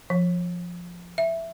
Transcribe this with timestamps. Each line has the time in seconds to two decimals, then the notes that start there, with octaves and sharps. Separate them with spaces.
0.10 F3
1.18 E5